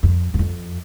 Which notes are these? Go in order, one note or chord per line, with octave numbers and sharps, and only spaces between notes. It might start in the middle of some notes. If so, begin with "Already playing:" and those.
F2
F#2
F2